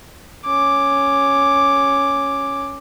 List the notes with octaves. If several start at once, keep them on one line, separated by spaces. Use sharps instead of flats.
C#4 D6